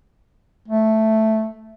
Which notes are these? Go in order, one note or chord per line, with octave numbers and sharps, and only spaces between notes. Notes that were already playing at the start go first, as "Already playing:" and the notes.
A3